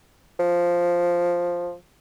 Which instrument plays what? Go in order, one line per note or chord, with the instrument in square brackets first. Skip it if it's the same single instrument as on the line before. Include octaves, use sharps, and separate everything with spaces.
[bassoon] F3